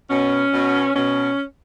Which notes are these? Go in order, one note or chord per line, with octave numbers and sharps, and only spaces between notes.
B2 C#4
B2
B2 C#4